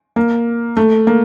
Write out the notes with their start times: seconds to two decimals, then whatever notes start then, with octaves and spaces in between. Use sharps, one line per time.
0.16 A#3
0.77 A3
1.07 A#3